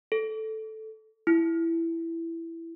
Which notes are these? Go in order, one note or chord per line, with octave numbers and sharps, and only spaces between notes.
A4
E4